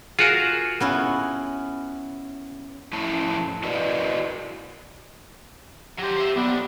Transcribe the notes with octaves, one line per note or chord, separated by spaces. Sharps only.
F4 F#4 G#4 A#4
B3 C#4 E4
F2 A2 C#4 E4 A5
E4 F#4 A#4 B4 D5 D#5
F#3 G4 C5
C5 E5
B1 B3 D4